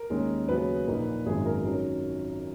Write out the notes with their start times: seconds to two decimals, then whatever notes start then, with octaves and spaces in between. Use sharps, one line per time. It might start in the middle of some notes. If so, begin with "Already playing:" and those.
Already playing: A#4
0.10 D#2 D#3 G#3 C#4
0.48 D#2 C#3 F#3 B3 B4
0.87 A#1 A#2 A#3 D#4
1.26 G#1 F#2 D#3 G#3 B3 G#4
1.46 A#4
1.65 D#3 F#3 C#4 A#4